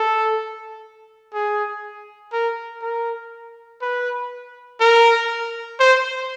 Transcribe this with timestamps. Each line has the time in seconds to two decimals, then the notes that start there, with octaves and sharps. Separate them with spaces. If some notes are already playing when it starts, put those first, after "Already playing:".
Already playing: A4
1.34 G#4
2.33 A#4
2.82 A#4
3.82 B4
4.80 A#4
5.80 C5